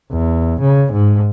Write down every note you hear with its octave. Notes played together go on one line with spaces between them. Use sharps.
E2
C#3
G#2